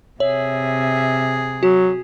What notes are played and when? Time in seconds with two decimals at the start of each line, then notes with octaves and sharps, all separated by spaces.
0.20 C3 G#4 C#5 E5
1.63 F#3 F#4